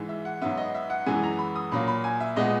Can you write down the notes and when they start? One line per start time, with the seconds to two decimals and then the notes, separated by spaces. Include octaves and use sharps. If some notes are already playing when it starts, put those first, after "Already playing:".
Already playing: G#2 E3 G#3
0.09 E5
0.25 F#5
0.41 G#2 F#3 B3 E5
0.57 D#5
0.75 E5
0.90 F#5
1.06 F#2 E3 G#3 B3 G#5
1.23 A#5
1.39 B5
1.56 D#6
1.71 A#2 F#3 A#3 B5
1.88 B5
2.04 G#5
2.20 E5
2.36 A#2 G#3 B3 D#5